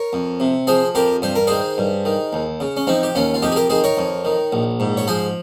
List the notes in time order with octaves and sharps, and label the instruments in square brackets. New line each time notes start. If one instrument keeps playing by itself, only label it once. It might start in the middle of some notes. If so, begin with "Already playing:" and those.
Already playing: [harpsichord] A#4 C#5
F2
C3
F3 G#4 C5
F2 G4 A#4
G2 C5
A#4
D#3 G#4 C5
G2
D#3
D#2
C#3
C#4
F3 C4 D#4
G4
D#2 C#4 F4
F4
F2 D#4 G4
G#4
G4 A#4
D#3 G#4 C5
A#4 C#5
F2
D#3
A#1
G#2
C#5
F3 G#4 C5